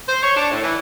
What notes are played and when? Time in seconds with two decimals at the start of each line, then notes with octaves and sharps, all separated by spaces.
0.08 C5
0.23 C#5
0.36 D4
0.50 A2
0.63 E3